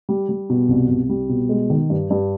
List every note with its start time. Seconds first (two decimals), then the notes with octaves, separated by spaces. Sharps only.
0.09 G3
0.29 G3
0.50 B2
0.69 C2
0.89 C2
1.09 G3
1.29 B2
1.49 G#3
1.70 D#3
1.90 G2
2.10 G2